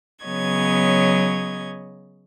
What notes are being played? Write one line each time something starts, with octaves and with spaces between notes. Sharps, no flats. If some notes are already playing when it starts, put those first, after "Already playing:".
C#3 F#3 B3 C#5 D#5 G#6